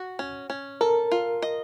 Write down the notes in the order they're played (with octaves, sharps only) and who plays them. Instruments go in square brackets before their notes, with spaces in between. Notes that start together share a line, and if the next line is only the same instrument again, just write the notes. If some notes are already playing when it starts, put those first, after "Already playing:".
Already playing: [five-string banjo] F#4
C#4
C#4
[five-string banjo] A4 [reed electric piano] A#4
[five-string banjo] F4
D#5